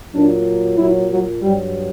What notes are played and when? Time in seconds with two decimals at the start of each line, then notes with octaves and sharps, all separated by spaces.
0.14 A#2 F#3 D4
0.78 A#2 F#3 E4
1.10 F#3
1.42 G2 F#3 G3